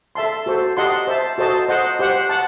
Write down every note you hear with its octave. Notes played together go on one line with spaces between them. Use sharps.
A4 E5 A5 C6
F#4 A4 C5
G4 D#5 F#5 A5 C6
C5 E5 A5
F#4 A4 C5 D#5 A5
C5 D#5 F#5
G4 C5 F#5
F#5 A5